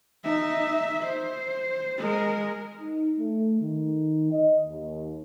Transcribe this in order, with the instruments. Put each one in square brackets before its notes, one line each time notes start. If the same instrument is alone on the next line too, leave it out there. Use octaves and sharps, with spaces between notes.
[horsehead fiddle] D#4 E5
C5
G#3 A#4
[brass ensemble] D#4
A3
D#3
D#5
D#2